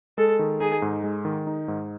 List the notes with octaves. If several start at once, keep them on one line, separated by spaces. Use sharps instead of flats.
G#3 A4
D#3
D#4 G#4
G#2
G#3
D#3
D#4
G#2